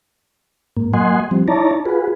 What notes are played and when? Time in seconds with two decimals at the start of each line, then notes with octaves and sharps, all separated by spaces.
0.77 G#2 A#3
0.94 F#3 A#3 D#5 F#5 G#5 C6
1.31 F3 G3 C4
1.48 D#4 E4 C#5 D5 A5 A#5
1.85 F4 F#4 G#4 B4